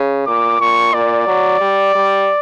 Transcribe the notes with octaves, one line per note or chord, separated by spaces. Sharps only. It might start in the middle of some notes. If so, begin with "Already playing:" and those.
Already playing: C#3
A#2 D6
A#2 C#6
A#2 D5
F#3
G3
G3